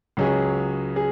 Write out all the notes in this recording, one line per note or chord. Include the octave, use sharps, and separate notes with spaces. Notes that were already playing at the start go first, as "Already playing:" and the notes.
C#2 C#3 F#3 C#4 G#4
G#4